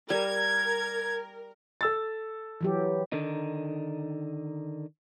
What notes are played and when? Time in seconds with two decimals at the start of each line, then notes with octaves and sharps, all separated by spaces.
0.10 G3 A#4 G#6
1.81 A4 E6 A6
2.61 E3 F#3 G4
3.12 D3 D#3 D#4